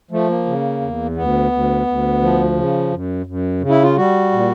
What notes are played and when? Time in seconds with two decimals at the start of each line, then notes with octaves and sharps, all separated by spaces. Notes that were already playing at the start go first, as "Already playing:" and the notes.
0.11 F3 A3
0.29 A#3
0.46 C#3
0.81 E2
1.16 D2 B3
1.52 D2
1.87 D2
2.22 F3
2.56 C#3
2.92 F#2
3.26 F#2
3.61 C#3
3.69 E4
3.83 F4
3.96 G3 F#4
4.32 A#2